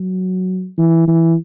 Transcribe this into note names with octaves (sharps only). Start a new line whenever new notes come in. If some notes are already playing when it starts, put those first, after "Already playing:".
Already playing: F#3
E3
E3